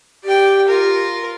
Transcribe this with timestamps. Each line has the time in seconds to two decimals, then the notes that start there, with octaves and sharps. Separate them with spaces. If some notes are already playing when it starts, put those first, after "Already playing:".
0.24 G4 D5 G5
0.68 F4 A#4